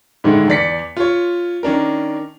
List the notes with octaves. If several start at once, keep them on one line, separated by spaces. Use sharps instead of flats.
G#2 D3 D#3 G#3 A3 E4
E2 D5 B6 C#7
F4 C#5
D#3 C#4 D4 A#4